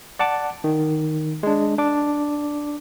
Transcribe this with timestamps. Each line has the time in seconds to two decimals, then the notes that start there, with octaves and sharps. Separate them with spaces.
0.19 D5 F#5 A5 D6
0.64 D#3
1.43 G#3 D4
1.78 D4 D6